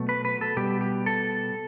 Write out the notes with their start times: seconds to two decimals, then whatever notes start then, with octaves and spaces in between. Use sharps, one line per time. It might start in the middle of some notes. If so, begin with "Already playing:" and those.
Already playing: B2 F#3 A3
0.09 B4
0.25 B4
0.41 A4
0.57 B2 G3 B3 G4
0.81 G4
1.06 A4